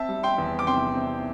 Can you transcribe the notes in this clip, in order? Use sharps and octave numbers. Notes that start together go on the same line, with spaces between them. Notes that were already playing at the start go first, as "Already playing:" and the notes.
Already playing: C4 E5 A5
G3
G5 C6
E2
D6
C3 G5 C6
C4